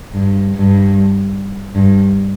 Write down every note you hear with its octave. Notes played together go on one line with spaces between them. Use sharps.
G2
G2
G2